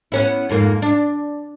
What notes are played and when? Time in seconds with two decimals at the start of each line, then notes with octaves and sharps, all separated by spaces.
0.12 B3 C#4 E4
0.49 F2 G#2 A#3
0.82 D4